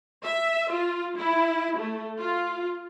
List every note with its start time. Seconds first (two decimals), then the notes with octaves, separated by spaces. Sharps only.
0.24 E5
0.72 F4
1.18 E4
1.78 A3
2.19 F4